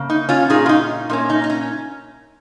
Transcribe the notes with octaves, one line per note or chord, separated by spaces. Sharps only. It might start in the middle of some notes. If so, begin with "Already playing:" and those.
Already playing: C#3 A#3
D#4
C#4 F4
A#2 A#3 C#4 D#4 G#4
F4
D#4
A#2 A#3 C#4 D#4
D#4
D#4
C#4